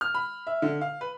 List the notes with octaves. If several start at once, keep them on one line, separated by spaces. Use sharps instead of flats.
F6
B5
E5
D3
F5
B4